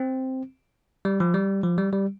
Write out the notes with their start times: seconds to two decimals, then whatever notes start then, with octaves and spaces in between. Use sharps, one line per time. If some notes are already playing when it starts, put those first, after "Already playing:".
Already playing: C4
1.05 G3
1.20 F3
1.34 G3
1.63 F3
1.78 G3
1.93 G3